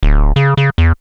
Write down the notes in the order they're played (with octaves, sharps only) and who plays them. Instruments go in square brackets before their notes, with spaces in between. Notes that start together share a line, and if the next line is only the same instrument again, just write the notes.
[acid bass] D1
C#3
C#3
E2